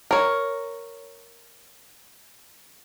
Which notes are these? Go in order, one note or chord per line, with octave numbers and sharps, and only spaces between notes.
A#4 C#5